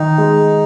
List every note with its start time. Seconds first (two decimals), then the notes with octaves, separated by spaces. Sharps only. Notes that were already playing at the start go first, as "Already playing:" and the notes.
Already playing: D#3 D#4
0.18 G#3